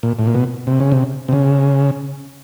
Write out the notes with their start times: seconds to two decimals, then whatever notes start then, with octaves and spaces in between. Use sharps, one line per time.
0.03 A#2
0.19 A2
0.27 A#2
0.35 B2
0.67 C3
0.80 C#3
0.92 C3
1.28 C3
1.33 C#3